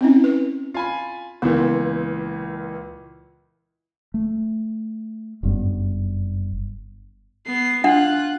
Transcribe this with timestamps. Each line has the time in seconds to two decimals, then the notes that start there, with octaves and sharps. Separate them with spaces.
0.01 C4 C#4 E4
0.24 B4
0.74 F4 G#5 B5
1.42 C#2 A#2 E3 B3
4.14 A3
5.43 F#1 G2 B3
7.47 B3 C7
7.84 D4 F4 F#5 F#6